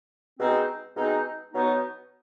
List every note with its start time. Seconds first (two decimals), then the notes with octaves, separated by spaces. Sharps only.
0.39 B2 G#3 C4 D#4
0.96 B2 G#3 C4 D#4
1.53 B2 F#3 B3 D#4